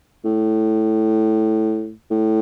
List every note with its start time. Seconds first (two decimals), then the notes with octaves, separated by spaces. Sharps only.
0.25 A2
2.11 A2